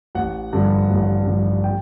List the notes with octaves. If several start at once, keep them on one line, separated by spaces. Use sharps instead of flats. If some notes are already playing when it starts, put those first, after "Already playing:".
A1 F#5
G2 D3 F3
A1
G2 D3 F3
G5